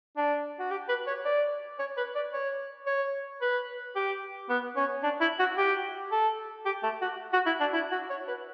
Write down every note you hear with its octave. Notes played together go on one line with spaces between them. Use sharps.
D4
F#4
G4
B4
C#5
D5
C#5
B4
D5
C#5
C#5
B4
G4
B3
C#4
D4
E4
F#4
G4
A4
G4
A3
F#4
F#4
E4
D4
E4
F#4
C#5
B4